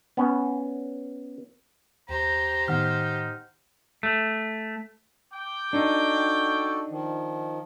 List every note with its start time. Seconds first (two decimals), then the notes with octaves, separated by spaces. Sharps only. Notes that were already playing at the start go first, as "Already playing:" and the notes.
0.17 B3 C#4
2.09 D#2 G4 C5 A#5
2.68 A2 D#3 B3 D#4 F#5 F6
4.03 A3
5.33 G5 D6
5.73 D4 D#4 F#4 A4
6.89 D#3 F3